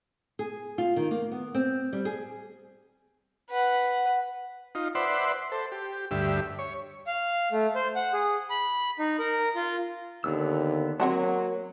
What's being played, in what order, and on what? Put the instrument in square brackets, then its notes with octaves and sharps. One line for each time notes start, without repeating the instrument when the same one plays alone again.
[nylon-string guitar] G#4
F4
D#3
A#3
B3
C4
G3
G#4
[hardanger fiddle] B4 F#5
[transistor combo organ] D#4 F4
B4 C5 D5 E5 F#5 C6
A4 C5
G4
D2 G2 G4 E5
C#5
[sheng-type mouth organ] F5
A3
C5
F#5
G#4
B5
D#4
A#4
F4
[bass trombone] D#2 [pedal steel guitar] D3 B3 E6
[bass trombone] F#3 [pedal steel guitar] A#3 [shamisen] C4 F#5 A5